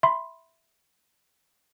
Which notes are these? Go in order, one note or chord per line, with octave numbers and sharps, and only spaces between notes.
E5 B5 C6